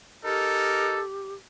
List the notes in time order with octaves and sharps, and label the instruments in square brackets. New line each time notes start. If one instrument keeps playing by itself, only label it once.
[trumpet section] D#4 A#4 [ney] G4 [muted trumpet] A4